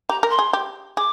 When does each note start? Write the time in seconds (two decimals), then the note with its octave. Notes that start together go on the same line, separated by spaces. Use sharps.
0.09 G4 A#5
0.23 A#4
0.30 C6
0.39 G#4
0.53 G4
0.97 G#4 D6